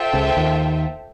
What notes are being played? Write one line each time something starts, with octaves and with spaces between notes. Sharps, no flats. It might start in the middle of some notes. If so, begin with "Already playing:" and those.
Already playing: F4 A4 C5 E5 G5
C#2 C#3
D#2 D#3